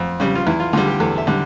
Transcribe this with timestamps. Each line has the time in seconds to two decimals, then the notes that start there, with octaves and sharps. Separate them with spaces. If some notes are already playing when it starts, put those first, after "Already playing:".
Already playing: F2
0.20 C#3 G3
0.35 F4
0.47 E2 E4
0.60 F4
0.73 D3 G3 F4
0.87 G4
1.00 E2 A4
1.18 E5
1.27 D3 G3